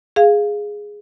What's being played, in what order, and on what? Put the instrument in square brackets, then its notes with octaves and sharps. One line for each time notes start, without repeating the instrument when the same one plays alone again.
[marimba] G#4 F5